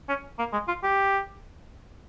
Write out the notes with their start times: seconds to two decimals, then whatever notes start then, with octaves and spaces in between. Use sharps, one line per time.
0.09 C#4
0.39 A#3
0.53 G#3
0.68 F4
0.83 G4